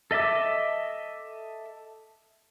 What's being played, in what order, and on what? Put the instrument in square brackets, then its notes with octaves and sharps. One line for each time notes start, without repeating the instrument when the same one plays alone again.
[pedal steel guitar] A4 D#5 E5 D6 E6